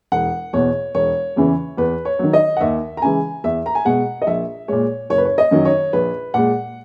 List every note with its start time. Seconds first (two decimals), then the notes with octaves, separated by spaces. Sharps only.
0.12 E1 F#5
0.53 E2 B2 C#5
0.95 E1 C#5
1.36 E2 C#3 E3
1.77 E2 B4
2.05 C#5
2.19 D#3 F#3
2.33 D#5
2.57 F#5
2.60 D#2 E5
2.97 A#5
3.02 C#3 E3 G#3 G#5
3.44 E2 E5
3.66 A#5
3.75 G#5
3.85 B2 G#3 F#5
4.22 D#5
4.27 A#1 E5
4.68 A#2 G#3 C#5
5.10 F#1 C#5
5.18 B4
5.25 C#5
5.38 D#5
5.51 F#2 D#3 F#3
5.65 C#5
5.93 A#1 B4
6.34 A#2 G#3 F#5